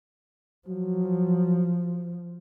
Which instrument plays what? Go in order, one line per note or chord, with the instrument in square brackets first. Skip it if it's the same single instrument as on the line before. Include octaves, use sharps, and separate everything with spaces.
[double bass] F3 [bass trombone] F#3